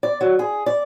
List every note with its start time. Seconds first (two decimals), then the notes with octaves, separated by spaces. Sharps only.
0.03 D5
0.21 F#3
0.39 G#4
0.66 D5